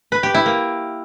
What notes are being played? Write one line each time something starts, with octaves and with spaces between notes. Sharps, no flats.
B4
G4
E4
A#3